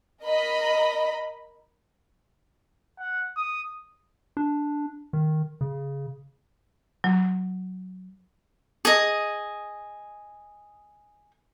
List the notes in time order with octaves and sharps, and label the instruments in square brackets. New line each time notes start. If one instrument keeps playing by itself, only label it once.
[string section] A#4 D#5 B5
[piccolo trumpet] F#5
D#6
[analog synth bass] D4
D#3
C#3
[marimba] F#3
[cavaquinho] G#4 D#5